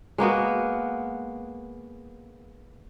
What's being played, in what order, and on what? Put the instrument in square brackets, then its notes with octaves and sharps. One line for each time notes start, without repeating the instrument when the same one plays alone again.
[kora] G#3 A#3 B3 F#4